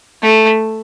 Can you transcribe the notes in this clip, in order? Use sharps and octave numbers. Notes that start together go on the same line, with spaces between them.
A3